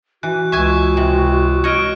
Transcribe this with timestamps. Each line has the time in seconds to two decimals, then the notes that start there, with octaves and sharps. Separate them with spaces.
0.23 E3 F#4 F#6
0.52 C#2 E5 G#5 C#6
0.97 C3
1.64 C#5 D#5 C#6 F6 D7